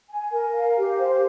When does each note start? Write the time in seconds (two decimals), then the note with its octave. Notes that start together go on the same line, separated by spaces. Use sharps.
0.10 G#5
0.32 A#4
0.53 F5
0.77 G4
0.98 C5